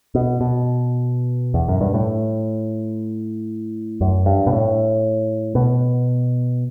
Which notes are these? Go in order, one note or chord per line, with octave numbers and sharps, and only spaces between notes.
B2
B2
E2
F#2
G2
A2
F#2
G2
B2
A2
B2